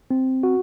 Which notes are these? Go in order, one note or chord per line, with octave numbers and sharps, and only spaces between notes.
C4
F#4